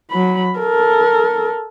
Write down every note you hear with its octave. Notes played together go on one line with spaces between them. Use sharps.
F#3 B5
A4 A#4